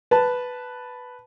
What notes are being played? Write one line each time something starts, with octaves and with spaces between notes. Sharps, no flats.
B4 A5